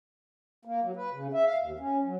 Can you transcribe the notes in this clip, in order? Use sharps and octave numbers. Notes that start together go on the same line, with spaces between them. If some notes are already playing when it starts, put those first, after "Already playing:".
A#3
F#3
B4
C#3
E5
F5
D#2
C#4
F#3